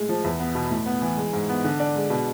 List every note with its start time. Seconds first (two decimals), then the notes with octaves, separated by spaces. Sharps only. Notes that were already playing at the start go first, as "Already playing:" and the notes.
Already playing: A2 G#3
0.09 F3
0.24 E2
0.40 B3
0.55 B2
0.71 A2
0.86 B3
1.02 E3
1.17 G#3
1.33 G#2
1.49 B3
1.64 D3
1.80 D4
1.96 G#3
2.10 B2